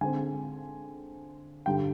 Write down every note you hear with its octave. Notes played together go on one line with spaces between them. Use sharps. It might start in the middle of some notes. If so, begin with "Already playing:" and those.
D3 G#3 C4 G#5
G2 D3 G3 G5